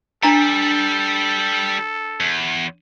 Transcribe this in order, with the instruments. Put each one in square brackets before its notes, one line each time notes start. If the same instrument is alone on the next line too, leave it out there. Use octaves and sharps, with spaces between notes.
[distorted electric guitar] G3 [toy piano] D4 A#5 [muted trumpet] A4
[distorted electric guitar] E2